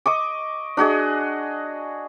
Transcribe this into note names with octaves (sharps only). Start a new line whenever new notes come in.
D#5 C#6 D6
D4 F#4 G#4 D#5